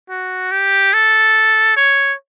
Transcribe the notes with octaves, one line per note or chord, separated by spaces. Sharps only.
F#4
G4
A4
C#5